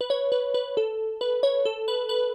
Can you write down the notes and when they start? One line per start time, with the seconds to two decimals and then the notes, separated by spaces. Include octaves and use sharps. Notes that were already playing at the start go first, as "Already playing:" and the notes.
0.01 B4
0.10 C#5
0.32 B4
0.54 B4
0.77 A4
1.21 B4
1.43 C#5
1.65 A4
1.88 B4
2.09 B4